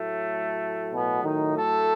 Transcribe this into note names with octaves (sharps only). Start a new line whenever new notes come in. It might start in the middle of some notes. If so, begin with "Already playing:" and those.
Already playing: A2 F#3 A3
B2 B3
D#3 D#4
A3 A4